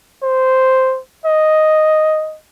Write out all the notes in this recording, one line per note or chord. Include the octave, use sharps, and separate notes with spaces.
C5
D#5